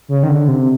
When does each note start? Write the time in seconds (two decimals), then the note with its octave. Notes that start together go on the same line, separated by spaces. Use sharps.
0.08 C#3
0.23 D#3
0.29 D3
0.48 C3